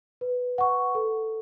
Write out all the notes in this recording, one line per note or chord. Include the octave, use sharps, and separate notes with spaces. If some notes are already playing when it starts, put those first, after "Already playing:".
B4
F#5 C#6
A4